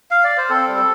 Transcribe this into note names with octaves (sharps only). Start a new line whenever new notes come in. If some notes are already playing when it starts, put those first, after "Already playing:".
F5
D5
C5
C4 A4
G3
A4